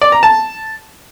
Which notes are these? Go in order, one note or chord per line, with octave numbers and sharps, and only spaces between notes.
D5
A#5
A5